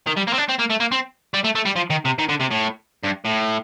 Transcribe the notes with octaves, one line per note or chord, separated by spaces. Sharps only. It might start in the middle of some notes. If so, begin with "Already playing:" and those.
D#3
G3
A#3
C4
D4
C4
A#3
A3
A#3
C4
G3
A3
A3
G3
F3
D#3
C3
D#3
D3
C3
A2
G2
A2